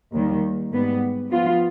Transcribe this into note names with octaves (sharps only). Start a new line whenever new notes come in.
D#2 D#3 G3
G#2 G3 B3
F3 B3 F4